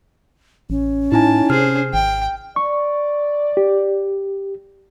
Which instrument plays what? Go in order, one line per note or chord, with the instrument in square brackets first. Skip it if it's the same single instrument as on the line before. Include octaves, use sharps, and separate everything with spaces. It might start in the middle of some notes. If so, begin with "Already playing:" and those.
[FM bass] A1 [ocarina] C#4
[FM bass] A2 [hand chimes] D#4 E4 G#5 [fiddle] A5
[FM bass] C3 [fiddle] G#4 C5 [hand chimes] F6
[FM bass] G#1 [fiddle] G5
[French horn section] D5 [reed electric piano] C#6
[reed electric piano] G4